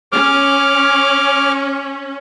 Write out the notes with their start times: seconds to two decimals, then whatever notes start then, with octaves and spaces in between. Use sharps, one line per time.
0.12 C#4 D6 F6